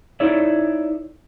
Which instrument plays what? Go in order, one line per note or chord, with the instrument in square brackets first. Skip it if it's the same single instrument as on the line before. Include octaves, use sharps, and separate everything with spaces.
[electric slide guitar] D#4 E4 A4 C#5 D5 E5